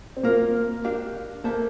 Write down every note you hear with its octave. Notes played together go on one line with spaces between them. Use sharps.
C4
A#3 F4 A#4 F5
D4 G4 A#4 F5
A#3 A4 C5 E5